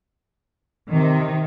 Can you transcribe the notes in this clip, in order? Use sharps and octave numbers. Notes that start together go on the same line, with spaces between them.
C3 D#3